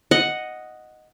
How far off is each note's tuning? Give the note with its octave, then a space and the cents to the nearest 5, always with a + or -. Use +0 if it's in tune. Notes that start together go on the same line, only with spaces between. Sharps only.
D#5 +0 F#5 +0